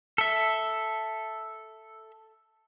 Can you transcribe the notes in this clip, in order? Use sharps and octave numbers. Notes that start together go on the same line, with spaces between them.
A4 E5